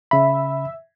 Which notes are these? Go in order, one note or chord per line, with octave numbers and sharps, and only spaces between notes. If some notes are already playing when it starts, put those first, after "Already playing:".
C#3 E5 B5